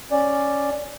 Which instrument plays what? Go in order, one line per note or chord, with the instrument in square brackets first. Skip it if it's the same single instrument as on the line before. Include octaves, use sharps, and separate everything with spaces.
[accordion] C#4 D5